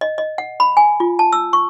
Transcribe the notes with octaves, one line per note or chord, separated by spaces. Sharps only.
D#5
D#5
F#5
B5
G#5
F4
A5
E6
C#6